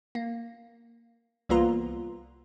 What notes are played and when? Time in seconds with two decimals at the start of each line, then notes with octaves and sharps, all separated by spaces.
0.15 A#3
1.49 C2 E3 A#3 B3 F4 A#5